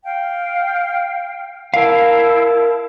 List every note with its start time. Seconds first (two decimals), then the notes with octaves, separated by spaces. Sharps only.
0.04 F5 G5
1.74 E4 A#4 F5 A5